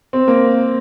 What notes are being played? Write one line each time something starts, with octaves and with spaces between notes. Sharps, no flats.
C4
A#3